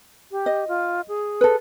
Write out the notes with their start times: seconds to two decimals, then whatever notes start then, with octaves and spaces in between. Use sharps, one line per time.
0.31 G4
0.46 D#5
0.68 F4
1.08 G#4
1.41 A4 B4